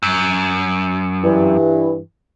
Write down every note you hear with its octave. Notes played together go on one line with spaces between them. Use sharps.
F#2
G2 E3